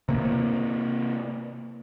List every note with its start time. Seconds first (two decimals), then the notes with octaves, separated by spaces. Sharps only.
0.09 C3 A#3